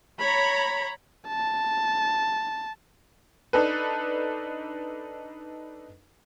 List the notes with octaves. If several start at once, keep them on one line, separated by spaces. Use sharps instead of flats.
C#5 A#5 B5
A5
D4 D#4 A4 B4